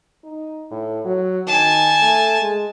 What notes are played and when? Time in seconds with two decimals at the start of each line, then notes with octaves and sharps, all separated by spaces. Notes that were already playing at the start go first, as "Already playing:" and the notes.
0.24 D#4
0.71 A2
1.05 F#3
1.47 D#3 G#5 A5
2.02 A3
2.41 G#3